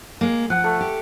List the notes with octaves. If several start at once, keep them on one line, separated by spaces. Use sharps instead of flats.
G#3 A#3
F3 F#5
A3
G4